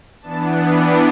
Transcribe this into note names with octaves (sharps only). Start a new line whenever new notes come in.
E3 B3 D4 A5
G5